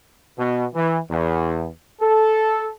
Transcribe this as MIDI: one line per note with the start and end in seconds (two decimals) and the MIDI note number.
0.39 0.66 47
0.75 0.99 52
1.10 1.68 40
2.01 2.72 69